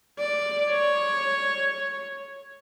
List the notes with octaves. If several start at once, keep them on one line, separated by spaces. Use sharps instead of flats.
D5
C#5